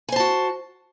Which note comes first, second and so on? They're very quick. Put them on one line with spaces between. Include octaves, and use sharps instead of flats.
G#5 C5 A5 F#4